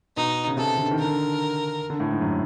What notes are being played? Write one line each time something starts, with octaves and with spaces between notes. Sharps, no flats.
B2 D#4
C#3
C3 A4
D3
D#3
A#4
D3
D3
A2
G#2
F#2